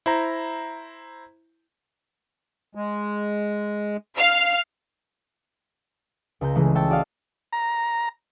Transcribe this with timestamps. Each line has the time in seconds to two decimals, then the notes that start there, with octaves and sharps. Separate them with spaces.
0.06 E4 C5 A#5
2.75 G#3
4.16 F5 F6
6.41 C#2 A#5 G6
6.55 C#3 E3 G#3 A3
6.75 C#5 E5 G5 A5 C#6
6.90 F#4 D5 D#5 F5
7.53 A#5